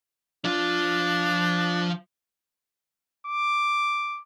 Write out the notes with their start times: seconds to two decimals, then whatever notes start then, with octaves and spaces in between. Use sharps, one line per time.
0.45 F3 D4 F4
3.27 D6